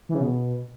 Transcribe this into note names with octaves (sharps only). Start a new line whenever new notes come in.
E3
C#3
B2